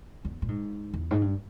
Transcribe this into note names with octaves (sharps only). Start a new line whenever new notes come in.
E2
A#2
G#2
E2
G#2
G2